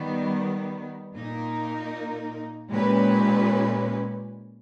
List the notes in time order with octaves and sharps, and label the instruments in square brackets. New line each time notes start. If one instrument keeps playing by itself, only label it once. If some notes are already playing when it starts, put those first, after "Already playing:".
Already playing: [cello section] D#3 G3 B3
A#2 A#3 D#4 A#4
A#2 G#3 C#4 G4 B4